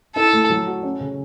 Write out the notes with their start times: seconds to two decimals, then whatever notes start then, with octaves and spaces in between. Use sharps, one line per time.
0.16 E4 A4
0.33 A3
0.50 F#3
0.67 F#4
0.83 C#4
1.00 C#3